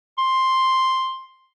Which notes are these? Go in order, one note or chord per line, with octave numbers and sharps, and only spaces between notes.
C6